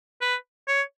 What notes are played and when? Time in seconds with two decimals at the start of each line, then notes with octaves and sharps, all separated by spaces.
0.21 B4
0.68 C#5